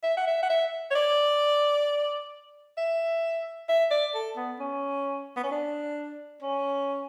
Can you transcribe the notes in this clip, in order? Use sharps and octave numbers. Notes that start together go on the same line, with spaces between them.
E5
F#5
E5
F#5
E5
C#5
D5
E5
E5
D5
A4
B3
C#4
B3
C#4
D4
C#4